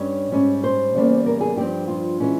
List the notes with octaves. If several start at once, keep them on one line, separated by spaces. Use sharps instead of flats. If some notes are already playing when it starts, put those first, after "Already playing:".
Already playing: G2 G3 C#4 C#5
G#2 G3 C#4
C5
E2 C#3 G3 A#3
A#4
G#4
G2 F3 C4 G4
F4
E3 G#3 C#4